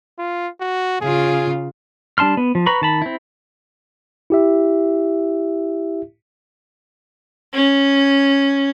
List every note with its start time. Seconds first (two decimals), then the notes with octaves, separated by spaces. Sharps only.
0.19 F4
0.61 F#4
1.01 C#3 F4 G#4
2.18 G3 D4 A5 C6 F6
2.37 B3
2.55 F3
2.66 B4 A#5 B5 C#6
2.82 D#3 A5 B5
3.02 C4 E4
4.30 E4 G4 E5
7.53 C#4